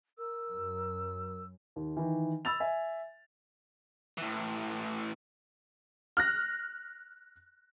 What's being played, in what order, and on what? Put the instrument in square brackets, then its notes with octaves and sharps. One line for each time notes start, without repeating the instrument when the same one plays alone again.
[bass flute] A#4 [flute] E6
[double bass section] F#2
[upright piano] D#2
D#3 E3
B5 E6 A6 F7
E5 G#5
[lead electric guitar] A2 E3
[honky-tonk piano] F6 F#6 A#6